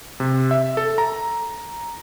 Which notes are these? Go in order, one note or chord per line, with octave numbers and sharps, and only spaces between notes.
C3
E5
A4
A#5